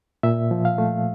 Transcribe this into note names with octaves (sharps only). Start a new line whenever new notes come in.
A#2 E5
F3
F5
A3